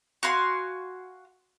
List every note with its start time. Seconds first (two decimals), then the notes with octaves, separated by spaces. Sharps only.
0.23 F#4 F5 G#5 C6